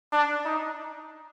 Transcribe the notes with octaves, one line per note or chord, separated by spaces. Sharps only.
D4
D#4